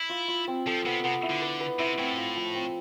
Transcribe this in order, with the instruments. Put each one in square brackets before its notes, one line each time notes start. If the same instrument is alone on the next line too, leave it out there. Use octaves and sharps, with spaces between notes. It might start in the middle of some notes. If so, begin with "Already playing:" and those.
Already playing: [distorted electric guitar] E4
[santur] F4
F4
C4
[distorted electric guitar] F3 [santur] A4
[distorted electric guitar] C3 [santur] B3
[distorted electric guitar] C3 [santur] B3
[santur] E4
[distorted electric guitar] D3
[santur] B4
B4
[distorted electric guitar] C3 [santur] E4
[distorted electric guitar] A2 [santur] C4
[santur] F4
F3
C4